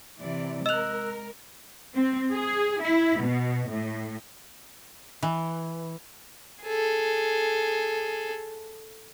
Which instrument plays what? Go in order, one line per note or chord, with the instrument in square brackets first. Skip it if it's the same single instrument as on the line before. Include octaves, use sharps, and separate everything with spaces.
[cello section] C3 E3 D5
[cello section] G#3 A#4 [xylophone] D#5 F7 [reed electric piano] E6 F#6
[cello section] C4
G#4
E4
B2
A2
[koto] E3
[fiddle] G#4 A4